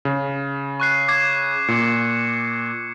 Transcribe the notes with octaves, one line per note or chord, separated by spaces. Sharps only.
C#3
C#6 F#6 C7
D6 G#6 C7
A#2 D6 C#7